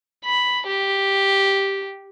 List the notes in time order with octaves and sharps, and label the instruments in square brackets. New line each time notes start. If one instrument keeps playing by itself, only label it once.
[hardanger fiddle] B5
G4